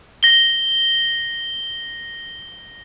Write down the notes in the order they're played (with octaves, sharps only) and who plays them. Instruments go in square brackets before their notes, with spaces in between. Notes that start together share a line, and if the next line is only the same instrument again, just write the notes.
[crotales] A#6 G7